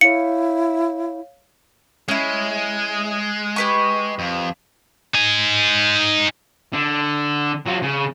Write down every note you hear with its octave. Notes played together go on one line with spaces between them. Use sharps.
E4 C#5 F5 C#7
G#3 C#4 E4
G4 B4 C#6
F2
D#4 G#5
D3
F#3 F4
C#3